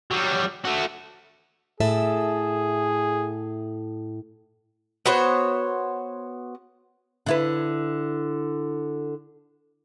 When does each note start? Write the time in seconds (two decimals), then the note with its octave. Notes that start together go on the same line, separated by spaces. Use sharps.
0.11 F#3 G3
0.65 A3 F#4
1.80 A2 G#4 A4 E5
5.06 B3 F#4 C5 C#5
7.26 D3 E4 B4